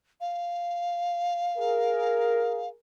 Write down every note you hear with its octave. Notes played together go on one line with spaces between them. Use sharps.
F5
G#4 A#4